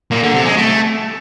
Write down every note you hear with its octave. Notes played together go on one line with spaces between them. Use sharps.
A#2
D3
C3
G#3
A3